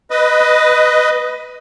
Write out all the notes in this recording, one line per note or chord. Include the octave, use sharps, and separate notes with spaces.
B4 D#5